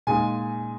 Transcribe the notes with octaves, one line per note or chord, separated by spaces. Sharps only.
A#2 G#3 D#4 G#5